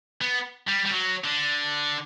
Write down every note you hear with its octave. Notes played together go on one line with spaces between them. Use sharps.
B3
G3
G3
F#3
D3